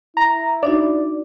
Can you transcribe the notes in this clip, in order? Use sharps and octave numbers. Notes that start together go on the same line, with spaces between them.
E4 A#5
D4 D#4 F#4 D5